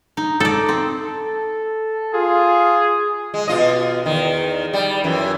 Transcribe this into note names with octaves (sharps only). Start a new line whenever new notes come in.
D#4
D#4 A4 D5
C4
A4
F4 G#4
G#3
B2 F4 D#5
E2 D#3
G3
F#2 E3